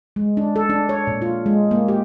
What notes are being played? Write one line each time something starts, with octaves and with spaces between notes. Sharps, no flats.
G#3
D4
A4
D4
C#5
A#2
F4
G#3
A#3
G4